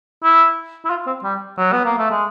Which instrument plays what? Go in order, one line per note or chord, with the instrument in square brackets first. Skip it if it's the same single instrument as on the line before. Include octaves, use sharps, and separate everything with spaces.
[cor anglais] E4
E4
F4
C4
G3
F#3
B3
A#3
A3
G#3